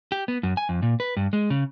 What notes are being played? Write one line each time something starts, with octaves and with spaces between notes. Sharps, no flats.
G4
B3
F#2
G#5
F2
A#2
B4
G2
G#3
C#3